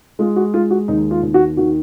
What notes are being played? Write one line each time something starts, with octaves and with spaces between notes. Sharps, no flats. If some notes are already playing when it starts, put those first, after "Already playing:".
G#3 F4
F#4
G#3 F4
F#4
D#2 D#4
F4
D#2
F#4
D#3 F#4